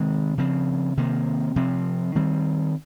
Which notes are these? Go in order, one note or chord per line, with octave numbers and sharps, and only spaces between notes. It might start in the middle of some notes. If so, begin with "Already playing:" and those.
Already playing: C3 D#3 G#3 C4
C#3 F3 C4
C3 D#3 A#3
C3 F3 C4
D#3 G3 C4